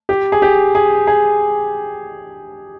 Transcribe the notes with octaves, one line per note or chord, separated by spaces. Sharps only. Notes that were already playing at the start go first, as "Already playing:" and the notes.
G4
G#4
G4
G#4
G#4